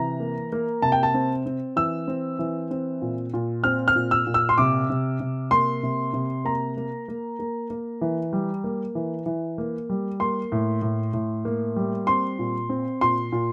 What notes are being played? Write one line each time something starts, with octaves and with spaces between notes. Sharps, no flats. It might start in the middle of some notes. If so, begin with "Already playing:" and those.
Already playing: C3 E3 A#5
A#3
A#3
C3 A5
G5
A5
C4
C4
E3 E6
C4
E3
C4
A#2
A#2
C4 F6
F6
A#2
E6
A#2
E6
C6
C3 D6
C3
C3
A#3 C6
C3
C3
A#3 A#5
A#3
A#3
A#3
A#3
E3
G3
A#3
E3
E3
A#3
G3
A#3 C6
A2
A2
A2
A#3
G3
C4 C6
A#2
C4
A#2 C6
A#2